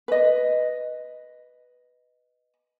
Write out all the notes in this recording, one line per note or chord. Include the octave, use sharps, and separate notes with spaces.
B4 D#5